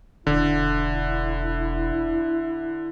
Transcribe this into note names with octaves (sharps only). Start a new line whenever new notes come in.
E1 D3 E4